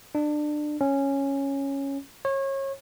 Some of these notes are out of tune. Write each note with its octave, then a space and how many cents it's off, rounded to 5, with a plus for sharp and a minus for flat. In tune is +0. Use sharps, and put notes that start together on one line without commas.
D4 +25
C#4 -5
C#5 -30